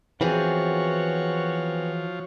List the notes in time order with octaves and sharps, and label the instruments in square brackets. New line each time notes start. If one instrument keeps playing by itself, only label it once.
[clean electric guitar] E3 [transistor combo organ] F3 [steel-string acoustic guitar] B3 C4 G#4 [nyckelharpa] F#4 C#5